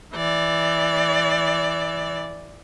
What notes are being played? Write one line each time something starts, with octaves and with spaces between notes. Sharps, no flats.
E3 D5